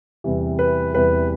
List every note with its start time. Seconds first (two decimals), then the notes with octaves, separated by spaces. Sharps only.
0.24 E2 C3 E3 G3
0.59 B4
0.93 E2 C3 E3 G3 B4